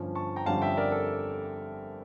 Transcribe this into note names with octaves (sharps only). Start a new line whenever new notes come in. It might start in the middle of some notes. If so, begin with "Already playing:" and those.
Already playing: G1 G2 F3 C#4
A5 C#6
G5 A#5
G1 F2 D3 G3 C#4 F5 A5
E5 G5
A#4 D5
A4